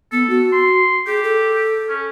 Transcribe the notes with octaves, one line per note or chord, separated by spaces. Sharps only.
B3 A4
F#4
C6
G4 G#4
A4
C#4